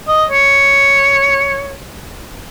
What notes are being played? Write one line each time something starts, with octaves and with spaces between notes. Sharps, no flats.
D#5
C#5